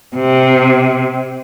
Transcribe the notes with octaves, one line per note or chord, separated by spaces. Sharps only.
C3